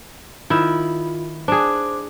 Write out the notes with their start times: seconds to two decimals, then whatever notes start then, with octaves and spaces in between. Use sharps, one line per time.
0.50 D#3 E4 F4
1.48 D4 G#4 C5 D6